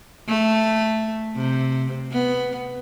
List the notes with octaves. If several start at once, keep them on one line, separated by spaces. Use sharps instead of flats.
A3
C3
B3